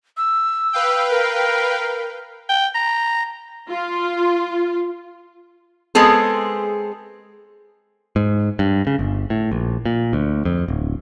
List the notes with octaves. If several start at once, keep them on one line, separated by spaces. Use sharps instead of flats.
E6
B4 F5 G5
A#4
G5
A#5
F4
G#3 B3 C4 G#4 A4
G#2
G2
C#3
G1
A2
A#1
A#2
D2
F2
D1